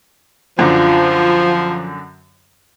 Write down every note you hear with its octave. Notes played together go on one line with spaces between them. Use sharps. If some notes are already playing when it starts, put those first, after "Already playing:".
F#2 D3 F3